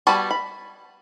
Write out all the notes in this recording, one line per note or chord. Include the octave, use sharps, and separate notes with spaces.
G3 B3 F#4 G#5 A5
B5